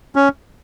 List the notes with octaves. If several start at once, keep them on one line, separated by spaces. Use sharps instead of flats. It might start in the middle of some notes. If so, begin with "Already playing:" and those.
C#4